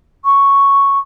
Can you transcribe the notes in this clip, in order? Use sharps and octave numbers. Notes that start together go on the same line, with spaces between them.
C#6